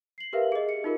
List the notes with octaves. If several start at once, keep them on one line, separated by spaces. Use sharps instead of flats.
C7 F#7
G4 A#4 B4 E5 F5
G#4 D#5
C#7
D#4 F4 A#4